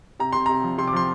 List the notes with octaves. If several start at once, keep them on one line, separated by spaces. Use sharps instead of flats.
C3 A#5
C3 C6
C3 A#5
F3
C3 C6
D6
F3 C6